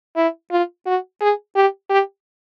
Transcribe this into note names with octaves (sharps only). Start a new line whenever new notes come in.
E4
F4
F#4
G#4
G4
G4